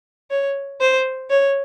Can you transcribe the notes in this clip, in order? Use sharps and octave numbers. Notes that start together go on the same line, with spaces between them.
C#5
C5
C#5